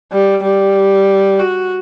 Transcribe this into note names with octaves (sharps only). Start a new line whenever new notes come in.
G3
G3
F#4